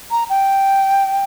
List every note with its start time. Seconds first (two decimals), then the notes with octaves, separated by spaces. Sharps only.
0.11 A#5
0.29 G5